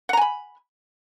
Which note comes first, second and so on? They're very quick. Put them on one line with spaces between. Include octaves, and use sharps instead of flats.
F#5 A#5 G#5 B5